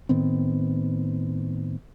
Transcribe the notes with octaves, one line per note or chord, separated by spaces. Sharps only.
A2 D#3 B3 C4